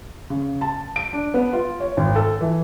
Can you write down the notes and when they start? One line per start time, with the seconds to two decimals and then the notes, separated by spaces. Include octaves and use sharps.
0.30 C#3
0.61 A5
0.96 D7
1.13 D4
1.34 B3
1.53 F4
1.80 C#5
1.97 G#1
2.16 A4
2.41 E3